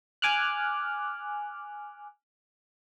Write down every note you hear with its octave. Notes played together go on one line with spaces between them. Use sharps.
G#5 D6 F6 F#6